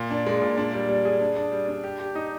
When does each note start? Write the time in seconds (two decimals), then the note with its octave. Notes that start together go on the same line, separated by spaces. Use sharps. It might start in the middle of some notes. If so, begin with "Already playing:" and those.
Already playing: A#2
0.11 D4
0.27 G#3
0.42 A#2
0.58 D4
0.73 G3
0.89 G3
1.05 G#4
1.21 D4
1.36 D4
1.52 G3
1.68 D4
1.84 G4
2.00 G4
2.15 D#4